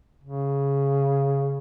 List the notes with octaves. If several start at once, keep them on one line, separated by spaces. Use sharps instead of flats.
C#3